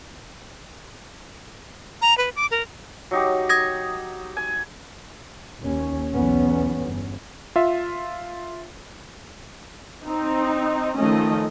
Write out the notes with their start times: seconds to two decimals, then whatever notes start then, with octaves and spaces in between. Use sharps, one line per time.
2.02 A#5
2.18 B4
2.36 D6
2.51 A#4
3.11 F#3 D#4 G4
3.49 D#6 G#6 A#6
4.37 G#5
5.59 D#2 C#4
6.11 B1 E2 B3 C#4
6.82 G1
7.56 F4 E5
10.05 C4 D#4
10.96 D#3 F3 A3 C#4 D#5